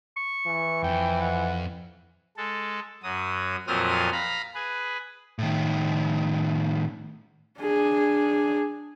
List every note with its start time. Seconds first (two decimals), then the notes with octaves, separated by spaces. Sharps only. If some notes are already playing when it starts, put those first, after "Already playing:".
0.17 C#6
0.46 E3
0.84 F2 G5
1.21 F#5
2.37 G#3 A4
3.03 F#2 F#3 D#6
3.67 F2 A#2 F#3 C4 D#6 F6
4.12 F5 A#5 B5
4.54 G#4 B4
5.39 A2 D#3
7.61 D4 G#4